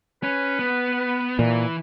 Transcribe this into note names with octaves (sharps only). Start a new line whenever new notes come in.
C#4 B4
B3
A#2 E3